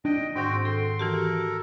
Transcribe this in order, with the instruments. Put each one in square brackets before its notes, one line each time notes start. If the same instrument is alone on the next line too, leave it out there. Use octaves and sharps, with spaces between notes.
[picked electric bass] D4 [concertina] D#5 G5
[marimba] G#2 D#3 [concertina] C4 F#4 G5
[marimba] A4 [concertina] C6
[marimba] E3 F#4 G4 [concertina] A4 A#4